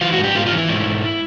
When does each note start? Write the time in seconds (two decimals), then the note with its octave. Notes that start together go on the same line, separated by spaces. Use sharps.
0.01 E3 F4
0.13 F#4
0.18 G#2
0.24 G4
0.35 G#2 F4
0.46 F4
0.52 E3
0.57 E4
0.68 G#2
0.86 G#2